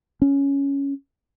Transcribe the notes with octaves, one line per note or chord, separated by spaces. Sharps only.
C#4